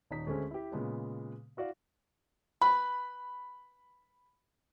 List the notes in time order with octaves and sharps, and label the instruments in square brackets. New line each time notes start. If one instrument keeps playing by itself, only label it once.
[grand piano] D#1 D#4 B6
D2 G#3 A3 C4 C#4
E4 G4
A#2 C#3 G#3 B3
E4 F#4 D5 F5
[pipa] B4 [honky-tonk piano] B5